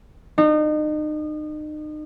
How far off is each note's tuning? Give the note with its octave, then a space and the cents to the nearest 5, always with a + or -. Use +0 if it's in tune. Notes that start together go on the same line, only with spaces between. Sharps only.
D#4 -35